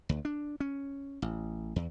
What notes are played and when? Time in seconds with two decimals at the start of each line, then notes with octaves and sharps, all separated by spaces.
0.09 D2
0.25 D4
0.60 C#4
1.22 A1
1.76 E2